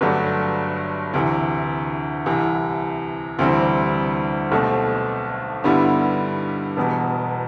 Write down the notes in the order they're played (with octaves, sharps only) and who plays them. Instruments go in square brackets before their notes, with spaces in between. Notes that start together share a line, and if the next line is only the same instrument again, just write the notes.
[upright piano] G1 G2 F#3 A3 D4
D2 C3 E3
C2 C3 E3
D2 C3 E3 G3 C4
B1 B2 A3 C4
G2 D3 G3 B3 E4
E1 E2 B2